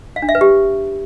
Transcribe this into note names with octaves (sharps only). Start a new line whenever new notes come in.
F5
D4
E5
B4
G4